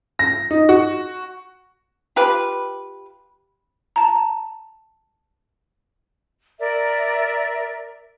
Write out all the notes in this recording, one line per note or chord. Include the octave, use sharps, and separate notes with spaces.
A#6
D#4
F#4
F4 G4 B4
A5 A#5
A#4 D5 E5